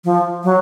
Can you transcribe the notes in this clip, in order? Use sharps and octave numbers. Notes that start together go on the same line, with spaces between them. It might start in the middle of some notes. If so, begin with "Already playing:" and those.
F3
F#3